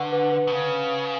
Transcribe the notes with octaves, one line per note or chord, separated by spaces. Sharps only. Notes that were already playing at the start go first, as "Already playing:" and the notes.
Already playing: D3 B4 F#5 C#6
B4
B4
B2
C#3 B4